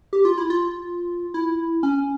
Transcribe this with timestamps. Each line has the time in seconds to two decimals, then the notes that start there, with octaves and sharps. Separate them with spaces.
0.13 G4
0.25 F4
0.38 E4
0.50 F4
1.34 E4
1.83 C#4